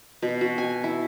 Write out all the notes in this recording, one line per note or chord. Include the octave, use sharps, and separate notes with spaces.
B2
F#4
G#5
E4